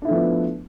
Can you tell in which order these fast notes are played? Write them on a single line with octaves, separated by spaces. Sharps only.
D4 E4 A3 F3 B3